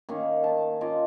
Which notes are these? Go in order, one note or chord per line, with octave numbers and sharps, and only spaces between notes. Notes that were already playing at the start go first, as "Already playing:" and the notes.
D#3 A#3 C#4
A5
C#4 F4 D#5 D6